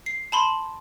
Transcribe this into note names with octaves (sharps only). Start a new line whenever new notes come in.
C7
A5 B5 C6